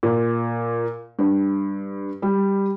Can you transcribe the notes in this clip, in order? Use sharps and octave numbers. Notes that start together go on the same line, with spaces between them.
A#2
G2
G3